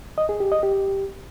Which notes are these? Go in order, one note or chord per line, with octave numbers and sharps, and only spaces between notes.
D#5
G#4
G4
D#5
G4